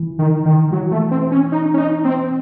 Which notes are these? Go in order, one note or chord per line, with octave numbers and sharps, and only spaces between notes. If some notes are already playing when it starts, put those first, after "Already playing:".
Already playing: E3
D#3
D#3
E3 F#3
A3
C4
C#4
D#4
C#4
D#4
C4